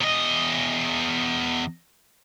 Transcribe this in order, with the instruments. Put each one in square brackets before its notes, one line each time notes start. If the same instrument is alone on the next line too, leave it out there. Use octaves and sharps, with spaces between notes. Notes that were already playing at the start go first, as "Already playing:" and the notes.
[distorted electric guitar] E2 D#5